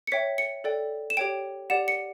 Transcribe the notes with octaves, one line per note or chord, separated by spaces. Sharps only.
C#7
C#5 E5 G5 B6
C#7
A4 D5 G5
E7
G4 C#5 G5 D7
G4 D5 F#5 E7
C#7